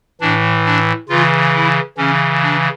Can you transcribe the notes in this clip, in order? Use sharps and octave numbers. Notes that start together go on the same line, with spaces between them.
A2 E3 D4
D4
C#3 E3 F4
E4
C#3 E3 C#4
D4